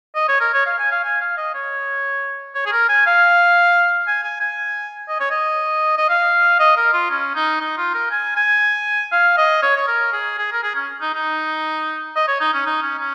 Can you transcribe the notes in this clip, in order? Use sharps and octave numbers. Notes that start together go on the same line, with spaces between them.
D#5
C#5
A#4
C#5
F5
G#5
F5
G#5
F5
D#5
C#5
C#5
G#4
A#4
G#5
F5
G#5
G#5
G#5
D#5
C#5
D#5
D#5
F5
D#5
A#4
F4
C#4
D#4
D#4
F4
A#4
G#5
G#5
F5
D#5
C#5
C#5
A#4
G#4
G#4
A#4
G#4
C#4
D#4
D#4
D#5
C#5
D#4
C#4
D#4
C#4
C#4